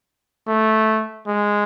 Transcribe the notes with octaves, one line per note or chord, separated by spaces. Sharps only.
A3
G#3